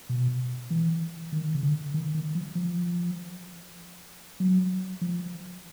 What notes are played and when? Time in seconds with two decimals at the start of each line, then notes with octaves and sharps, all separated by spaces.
0.09 B2
0.70 E3
1.32 D#3
1.55 C#3
1.63 D3
1.94 D#3
2.14 D#3
2.35 F3
2.55 F3
4.40 F#3
5.01 F3